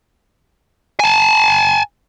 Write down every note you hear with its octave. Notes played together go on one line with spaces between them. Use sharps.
G#5 A5